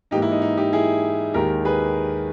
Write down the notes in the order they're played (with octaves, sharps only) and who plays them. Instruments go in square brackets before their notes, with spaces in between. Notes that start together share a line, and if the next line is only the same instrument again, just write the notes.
[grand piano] G#2 E3 A#3 D#4 G4
E4
D#4
D#4
D#4 G4
E4 G#4
D#2 D#3 G#3 G4 A#4
G#4 B4